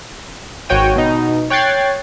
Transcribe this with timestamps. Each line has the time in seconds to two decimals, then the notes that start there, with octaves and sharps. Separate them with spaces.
0.69 G#1 F#4 C#5 G5 D#7
0.96 B2 D#4
1.50 C#5 G5 F#6 G#6 A6 C7